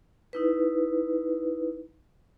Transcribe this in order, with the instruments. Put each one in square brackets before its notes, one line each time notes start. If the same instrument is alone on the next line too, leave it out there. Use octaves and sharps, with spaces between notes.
[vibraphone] D#4 E4 B4